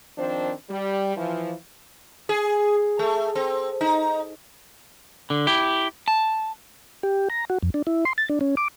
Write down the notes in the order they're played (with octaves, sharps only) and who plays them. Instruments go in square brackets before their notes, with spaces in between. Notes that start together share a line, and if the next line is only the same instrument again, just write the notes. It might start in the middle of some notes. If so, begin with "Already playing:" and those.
[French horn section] D#3 F3 C4 D4 C5
G3
E3 F3
[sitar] G#4
A3
C4
D#4
[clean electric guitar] D3
E4 G4
A5
[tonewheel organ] G4
A#5
F#4
F2
D4
E4
C6
A6
D4
C#4
D6